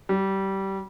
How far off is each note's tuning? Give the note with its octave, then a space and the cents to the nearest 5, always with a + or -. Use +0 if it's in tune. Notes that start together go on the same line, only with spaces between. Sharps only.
G3 -20